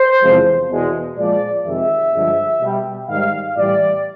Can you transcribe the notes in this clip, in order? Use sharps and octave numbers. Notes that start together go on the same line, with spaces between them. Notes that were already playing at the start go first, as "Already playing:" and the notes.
Already playing: C5
E2 C3 F3 G#3
E2 B2 G#3
A#2 F3 G#3 D5
F2 C3 D#3 G#3 E5
G2 D3 F3 G#3
B2 G3
G#2 D#3 G3 F5
A2 E3 G3 D5